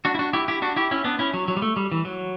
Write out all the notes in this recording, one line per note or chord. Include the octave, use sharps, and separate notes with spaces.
D4 F#4
E4
D4 F#4
E4 G4
E4 G4
D4 F#4
E4 G4
C#4 E4
B3 D4
C#4 E4
F#3
F#3
G3
A3
G3
E3
F#3